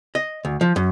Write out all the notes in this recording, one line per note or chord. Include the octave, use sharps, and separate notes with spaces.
D#5
D2
F3
F#2